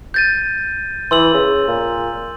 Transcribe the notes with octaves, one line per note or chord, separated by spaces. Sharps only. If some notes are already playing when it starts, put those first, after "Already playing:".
G6 A6 D#7
E3 C6 E6 F#7
C#3
A#2